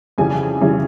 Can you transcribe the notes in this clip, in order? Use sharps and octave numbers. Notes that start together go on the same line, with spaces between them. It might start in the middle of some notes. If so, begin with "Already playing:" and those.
F2 C#3 E3 G3 G#5
F2 C#3 E3 G3